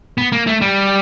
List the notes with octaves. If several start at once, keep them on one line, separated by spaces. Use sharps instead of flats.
B3
A#3
A3
G3